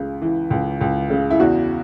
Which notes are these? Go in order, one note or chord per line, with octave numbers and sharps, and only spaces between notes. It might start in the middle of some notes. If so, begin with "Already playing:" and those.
Already playing: C#2 C#3
E3
C#2
C#2
C#3
E4
E2 F#4